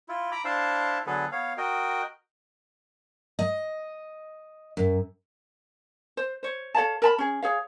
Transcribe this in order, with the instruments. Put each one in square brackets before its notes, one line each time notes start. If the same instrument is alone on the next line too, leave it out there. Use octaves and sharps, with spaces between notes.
[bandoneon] E4 F4
A#5 B5 D6
D4 E4 C5 E5 F5 A5
D3 F#3 B3 G#4 A4 B4
B3 C#5 F5
F#4 A#4 D#5 G5
[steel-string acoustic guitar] D#5
F#2
[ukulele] C5
C5 C#5
A4 C#5 F5 A5
A#4 A5 B5
C#4 G#4
G#4 C#5 F5